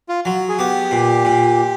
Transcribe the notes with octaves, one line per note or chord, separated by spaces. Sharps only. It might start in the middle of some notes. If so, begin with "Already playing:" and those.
F4
F#3
G#4
B3 G4
A#2
A#2